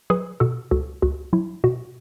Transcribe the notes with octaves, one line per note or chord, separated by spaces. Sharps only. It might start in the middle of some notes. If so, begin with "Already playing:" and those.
F#3 G#4 B4
B2 F#4 A4
C#2 F#4 A4
C#2 F#4
F#3 E4
B2 F#4